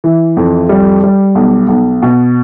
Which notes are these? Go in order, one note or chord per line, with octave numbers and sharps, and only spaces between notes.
E3
F2
G3
G3
B1
B1
B2